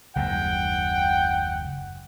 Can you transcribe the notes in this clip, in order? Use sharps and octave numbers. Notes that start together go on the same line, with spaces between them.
F#1 D#2 G#2 F#5 G5